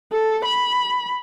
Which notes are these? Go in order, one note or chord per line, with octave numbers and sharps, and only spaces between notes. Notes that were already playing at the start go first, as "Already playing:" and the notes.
A4
B5